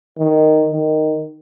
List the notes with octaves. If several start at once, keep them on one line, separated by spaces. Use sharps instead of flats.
D#3
D#3